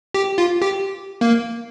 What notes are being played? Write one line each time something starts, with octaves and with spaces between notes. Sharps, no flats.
G4
F4
G4
A#3